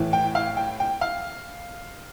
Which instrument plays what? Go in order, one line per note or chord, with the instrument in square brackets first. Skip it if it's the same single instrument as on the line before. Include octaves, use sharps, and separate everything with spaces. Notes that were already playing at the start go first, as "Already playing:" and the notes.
Already playing: [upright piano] A2 E3
G5
F5
G5
G5
F5